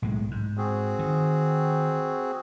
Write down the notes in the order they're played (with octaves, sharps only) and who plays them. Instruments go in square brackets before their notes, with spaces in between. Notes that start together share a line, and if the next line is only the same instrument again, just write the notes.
[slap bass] B1 A2 G#3
G#2
[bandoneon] C4 F#4 G#4
[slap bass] D#3